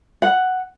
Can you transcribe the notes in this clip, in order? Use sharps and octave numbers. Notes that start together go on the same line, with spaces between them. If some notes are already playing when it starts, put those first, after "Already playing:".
F#5